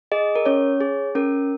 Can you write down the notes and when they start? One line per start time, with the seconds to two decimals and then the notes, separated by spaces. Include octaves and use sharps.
0.12 G#4 D#5
0.36 A#4
0.46 C#4 C#5
0.81 G#4
1.15 C#4 A#4